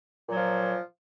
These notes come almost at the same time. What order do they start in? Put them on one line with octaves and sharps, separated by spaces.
A#2 F#3 F3